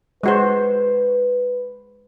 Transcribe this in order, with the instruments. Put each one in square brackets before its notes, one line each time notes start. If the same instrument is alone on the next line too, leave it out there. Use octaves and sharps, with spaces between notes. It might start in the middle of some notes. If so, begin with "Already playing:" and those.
[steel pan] G#3 F#4 C5 [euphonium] B4